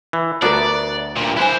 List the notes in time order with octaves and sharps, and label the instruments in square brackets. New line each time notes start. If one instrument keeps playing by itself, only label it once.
[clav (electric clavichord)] E3
[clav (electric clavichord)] D2 B3 D4 [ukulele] F#4 A#4 E5 [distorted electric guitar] D5
[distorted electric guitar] G2 A#2
[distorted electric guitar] E4 C5 [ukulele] B4 G#5